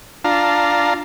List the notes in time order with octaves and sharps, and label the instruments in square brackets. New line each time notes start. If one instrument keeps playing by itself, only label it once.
[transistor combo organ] D4 F4 F5 A5 A#5